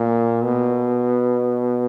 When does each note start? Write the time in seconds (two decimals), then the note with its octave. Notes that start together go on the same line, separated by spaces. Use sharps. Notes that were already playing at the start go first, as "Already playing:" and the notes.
Already playing: A#2
0.44 B2